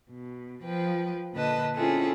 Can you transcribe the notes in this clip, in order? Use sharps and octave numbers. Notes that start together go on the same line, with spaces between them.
B2
F3 B4 G5
A#2 D3 B4 D#5 A5
C4 C#4 E4 F4 G#4 A4